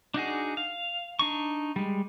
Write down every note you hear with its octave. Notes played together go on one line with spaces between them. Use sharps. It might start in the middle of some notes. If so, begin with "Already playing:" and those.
D4 D#4 F#4 G#4
F5
D4 D#4 C#6
G3 G#3